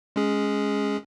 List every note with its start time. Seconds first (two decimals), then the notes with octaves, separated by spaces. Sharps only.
0.16 G#3 C#4 G#4